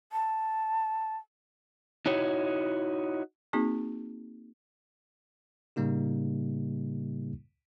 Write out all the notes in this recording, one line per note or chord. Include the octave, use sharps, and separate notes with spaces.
A5
D#4 E4 F#4 C#5
A#3 C4 D#4 F#4 G#4
A2 C#3 G3 A#3 D#4 G4